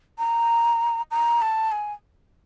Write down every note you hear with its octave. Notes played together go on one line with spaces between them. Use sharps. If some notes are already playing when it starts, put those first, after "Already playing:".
A#5
A#5
A5
G#5